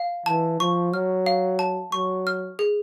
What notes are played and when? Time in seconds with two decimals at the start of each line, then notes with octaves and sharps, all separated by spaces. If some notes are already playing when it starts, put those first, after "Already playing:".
Already playing: F5
0.26 E3 A5
0.60 F3 C#6
0.93 F#3 F6
1.26 F5
1.59 A5
1.92 F#3 C#6
2.27 F6
2.59 G#4